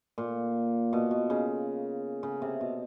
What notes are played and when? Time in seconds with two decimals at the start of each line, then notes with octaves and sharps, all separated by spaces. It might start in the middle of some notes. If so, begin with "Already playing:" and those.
0.18 A#2
0.93 B2
1.11 B2
1.30 C#3
2.23 C#3
2.42 C3
2.61 B2